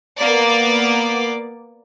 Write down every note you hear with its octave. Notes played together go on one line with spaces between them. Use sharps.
A#3 B3 D5